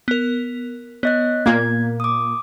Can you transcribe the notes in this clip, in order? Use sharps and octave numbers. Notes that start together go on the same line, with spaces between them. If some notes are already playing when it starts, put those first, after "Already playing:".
B3 A#4
B3 C#5 D#5 F#6
A#2 A#3 G#6
D6 D#6